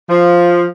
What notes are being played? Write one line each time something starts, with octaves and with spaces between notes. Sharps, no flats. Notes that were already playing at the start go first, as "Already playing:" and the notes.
F3